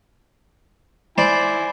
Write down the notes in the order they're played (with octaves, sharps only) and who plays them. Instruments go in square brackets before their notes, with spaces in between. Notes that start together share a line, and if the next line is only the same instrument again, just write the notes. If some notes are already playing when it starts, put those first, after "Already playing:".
[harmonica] E4 G#5 B5 [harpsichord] C5 D5